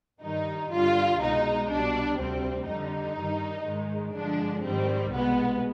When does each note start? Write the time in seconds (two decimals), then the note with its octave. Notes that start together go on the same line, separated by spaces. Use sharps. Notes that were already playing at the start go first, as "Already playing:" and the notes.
0.22 G2 D#3 G3 D#4
0.72 G2 D3 G3 F4
1.21 C2 B2 G#3 D#4
1.70 C2 B2 G3 D4
2.19 D2 C3 G3 C4
2.67 F2 D3 G3 D#4
3.17 G2 D#3 G3
3.66 G#2 D#3 G#3
4.14 G2 D3 F3 G#3 D4
4.64 G#2 D#3 G3 C4
5.12 C2 B2 G#3 B3